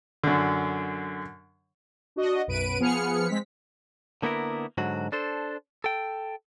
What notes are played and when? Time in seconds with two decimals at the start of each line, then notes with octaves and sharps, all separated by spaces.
0.24 F#2 D3
2.16 D4 F#4 D#5
2.47 B1 F#2 B4 D7 D#7
2.79 F3 B3 G#4 F6 C#7
3.29 G#3 C4 B6
4.22 D3 A#3 B3 E4 A#4
4.78 G#2 D3 F#3 F#4
5.12 D4 A4 C5
5.84 A4 G5